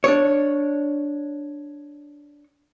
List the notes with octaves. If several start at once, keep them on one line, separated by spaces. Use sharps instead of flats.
D4 C#5